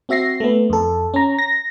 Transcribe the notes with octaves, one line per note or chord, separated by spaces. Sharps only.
C4 F#4 E5 A#6 C7
A3 B3
F2 A4
C#4 A#5
A#6